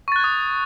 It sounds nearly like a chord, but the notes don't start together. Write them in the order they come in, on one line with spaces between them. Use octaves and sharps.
C#6 A6 F#6 G#6 D#6